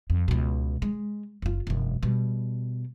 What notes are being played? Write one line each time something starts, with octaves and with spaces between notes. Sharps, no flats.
F2
C#2 B2
G#3
F#1 F4
E1 F#2
B2 G3